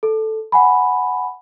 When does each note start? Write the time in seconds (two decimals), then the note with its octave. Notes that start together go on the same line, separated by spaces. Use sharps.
0.03 A4
0.52 F#5 G#5 B5